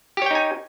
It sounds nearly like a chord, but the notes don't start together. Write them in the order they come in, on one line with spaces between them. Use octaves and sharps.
G4 C#5 G5 D#4 G#5